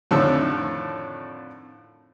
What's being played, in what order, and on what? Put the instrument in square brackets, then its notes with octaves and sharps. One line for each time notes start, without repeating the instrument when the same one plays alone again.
[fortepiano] F2 A2 D3 D#3 D4 E6